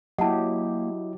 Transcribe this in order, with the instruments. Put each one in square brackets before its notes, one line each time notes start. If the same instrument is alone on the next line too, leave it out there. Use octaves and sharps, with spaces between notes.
[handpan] F#3 G4 [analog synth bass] A#3 [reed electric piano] E4 D#5 [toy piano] F#5 A5